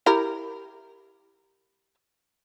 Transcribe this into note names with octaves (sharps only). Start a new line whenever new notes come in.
E4 G4 A#4